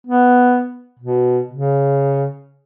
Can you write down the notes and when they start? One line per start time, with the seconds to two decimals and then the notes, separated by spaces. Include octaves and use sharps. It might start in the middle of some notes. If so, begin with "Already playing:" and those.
0.06 B3
0.99 B2
1.51 C#3